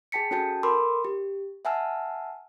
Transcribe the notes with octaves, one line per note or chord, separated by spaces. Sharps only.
G#4 G5 A5 B6 C#7
C#4 F#4 A4 G5 A5 G6
A4 A#4 B5 C6 D6 E6
G4
E5 F#5 G#5 A5 E6 F6